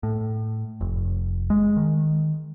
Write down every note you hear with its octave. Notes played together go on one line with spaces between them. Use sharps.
A2
F1
G#3
D#3